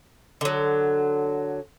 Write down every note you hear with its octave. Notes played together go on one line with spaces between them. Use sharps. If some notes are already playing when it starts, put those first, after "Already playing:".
D3 F#3